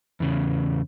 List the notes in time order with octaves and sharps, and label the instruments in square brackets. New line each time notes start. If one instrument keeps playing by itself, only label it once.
[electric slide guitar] E2 C#3